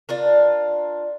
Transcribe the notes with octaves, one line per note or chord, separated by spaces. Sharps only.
D4 F4 A#4